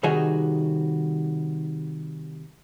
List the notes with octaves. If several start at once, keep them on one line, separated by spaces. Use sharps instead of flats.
C3 D#3 G3 D#4 F#4 G#4